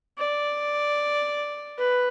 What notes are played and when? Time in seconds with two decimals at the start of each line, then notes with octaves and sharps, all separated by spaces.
0.18 D5
1.78 B4